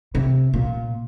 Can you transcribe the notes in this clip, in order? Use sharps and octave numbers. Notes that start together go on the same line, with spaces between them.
C3
A#2